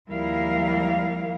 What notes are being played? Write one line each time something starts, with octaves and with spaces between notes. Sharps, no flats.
D#2 F3 G3 E4 A#4 F5